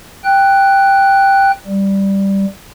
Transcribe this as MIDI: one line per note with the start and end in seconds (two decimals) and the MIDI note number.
0.24 1.51 79
0.24 1.51 90
1.67 2.45 55